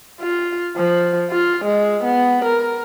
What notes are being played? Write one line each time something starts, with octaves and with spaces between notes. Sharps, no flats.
F4
F3
F4
G#3
B3
A#4